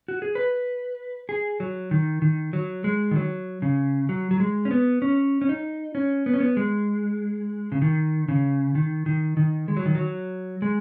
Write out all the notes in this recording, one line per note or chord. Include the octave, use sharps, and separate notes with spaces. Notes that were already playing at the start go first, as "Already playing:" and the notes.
F#4
G#4
B4
G#4
F#3
D#3
D#3
F#3
G#3
D#3
F#3
C#3
F#3
F#3
G#3
C#4
B3
C#4
C#4
D#4
C#4
B3
C#4
B3
G#3
C#3
D#3
C#3
D#3
D#3
D#3
G#3
F#3
D#3
F#3
G#3